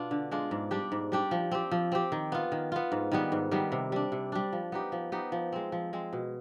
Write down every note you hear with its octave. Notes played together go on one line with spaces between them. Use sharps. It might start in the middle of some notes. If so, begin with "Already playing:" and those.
Already playing: B2 B3 D4 F4
D3
G#3 D4 F4
G#2
G3 D4 G4
G#2
G3 D4 G4
F3
C4 G4
F3
C4 G4
D#3
B3 F4
D#3
B3 F4
G#2
D#3 G3 B3
G#2
D#3 G3 B3
C3
G3 D4
C3
G3 D4
F3
B3 D#4 G4
F3
B3 D#4 G4
F3
G#3 C4
F3
G#3 C4
B2